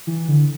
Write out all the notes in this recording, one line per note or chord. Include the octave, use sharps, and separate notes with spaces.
E3
D3